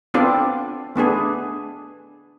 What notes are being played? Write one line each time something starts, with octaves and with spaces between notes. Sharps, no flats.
B3 C4 D4 F4 A4 D5
A3 B3 D4 G#4